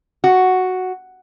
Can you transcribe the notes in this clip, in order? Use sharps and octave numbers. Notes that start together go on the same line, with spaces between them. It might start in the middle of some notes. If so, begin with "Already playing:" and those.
F#4